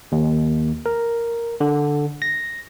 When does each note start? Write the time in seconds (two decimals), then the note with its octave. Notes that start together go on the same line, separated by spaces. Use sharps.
0.12 D#2
0.86 A#4
1.60 D3
2.22 A#6